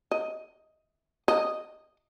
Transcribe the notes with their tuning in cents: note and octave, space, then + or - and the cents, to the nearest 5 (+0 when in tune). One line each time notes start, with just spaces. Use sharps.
D#5 +10
D#5 -10